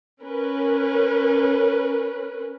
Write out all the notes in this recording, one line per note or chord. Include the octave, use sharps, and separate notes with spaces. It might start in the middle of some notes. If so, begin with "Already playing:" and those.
C#4 A#4 B4